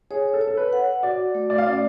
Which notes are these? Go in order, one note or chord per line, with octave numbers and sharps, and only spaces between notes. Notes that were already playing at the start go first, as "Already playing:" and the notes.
G#4 C#5
A4
C#5
A4
B4
F#5
F#4 D5
A3
D5
F5
C#4 D5